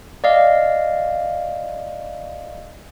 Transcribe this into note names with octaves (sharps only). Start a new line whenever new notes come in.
D5 D#5 F5